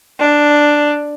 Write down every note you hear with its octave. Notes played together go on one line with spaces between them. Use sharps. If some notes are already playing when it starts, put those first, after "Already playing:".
D4